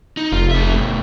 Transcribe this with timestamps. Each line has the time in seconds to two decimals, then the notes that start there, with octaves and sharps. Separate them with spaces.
0.17 D#4
0.32 F1 F4
0.51 G#4 E5
0.73 B2 A3